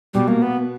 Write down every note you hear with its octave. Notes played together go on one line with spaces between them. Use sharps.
B2 G3
A#3
B3